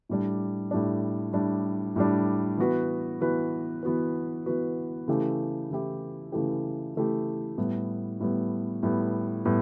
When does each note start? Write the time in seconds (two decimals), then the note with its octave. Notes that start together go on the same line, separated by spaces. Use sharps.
0.09 A2 G3 D4
0.71 A2 G3 D4
1.33 A2 G3 D4
1.96 A2 G3 D4
2.58 E3 B3 F#4 B4
3.21 E3 B3 F#4 B4
3.83 E3 B3 F#4 B4
4.46 E3 B3 F#4 B4
5.08 C#3 E3 A3 E4 G4
5.70 C#3 E3 A3 E4 G4
6.32 C#3 E3 A3 E4 G4
6.95 C#3 E3 A3 E4 G4
7.58 A2 G3 B3
8.20 A2 G3 B3
8.83 A2 G3 B3
9.45 A2 G3 B3